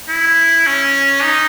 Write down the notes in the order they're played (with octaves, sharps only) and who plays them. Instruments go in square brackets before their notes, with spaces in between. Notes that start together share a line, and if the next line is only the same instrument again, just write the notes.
[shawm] E4
C#4
D#4